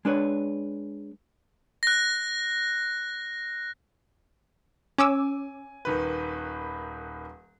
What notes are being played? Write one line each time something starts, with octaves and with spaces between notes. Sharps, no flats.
G#3 D4 B4 C#5
F#6 A#6
C#4 G#5 D6 E6
D#1 D#3 B4